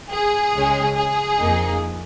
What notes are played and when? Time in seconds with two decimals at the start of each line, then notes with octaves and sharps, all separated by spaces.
0.10 G#4
0.53 C#2 C#3 G#3 C#4
0.96 G#4
1.39 F2 F3 A#3 D#4